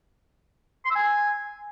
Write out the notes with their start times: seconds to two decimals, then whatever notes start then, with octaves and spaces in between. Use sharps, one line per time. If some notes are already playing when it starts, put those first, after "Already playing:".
0.85 C6
0.90 E6
0.96 G#5